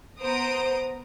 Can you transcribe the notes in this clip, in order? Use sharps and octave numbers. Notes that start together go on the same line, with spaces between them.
B3 C5 A#5 D#6 D7